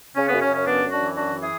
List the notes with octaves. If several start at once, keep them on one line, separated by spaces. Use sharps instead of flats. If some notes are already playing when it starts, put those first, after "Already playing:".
C#3 C#4
B3
F#2
C#4
C#3
C#4
F#2 B3 D4
F#2
D4 F#4
E3
F#2 D4 F#4
E3
E4 G#4